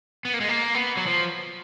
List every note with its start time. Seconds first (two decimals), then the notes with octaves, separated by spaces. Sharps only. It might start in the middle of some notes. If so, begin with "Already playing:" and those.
0.25 B3
0.34 A#3
0.41 G#3
0.49 A#3
0.75 B3
0.97 F#3
1.07 F3